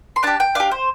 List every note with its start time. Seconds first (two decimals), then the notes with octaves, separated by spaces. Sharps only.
0.16 C6
0.23 D4 G4 A5
0.40 G5
0.55 D4 G4 F5
0.71 C5